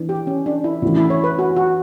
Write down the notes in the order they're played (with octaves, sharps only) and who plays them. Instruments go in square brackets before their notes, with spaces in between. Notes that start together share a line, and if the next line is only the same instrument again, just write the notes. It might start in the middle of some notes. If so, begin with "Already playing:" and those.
Already playing: [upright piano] E3 B3 D4
[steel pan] G4
C#4
D4
E4
[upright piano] C#3 E3 A3 D4 [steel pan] F#4
[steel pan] E4
C#5
B4
F#4
F#4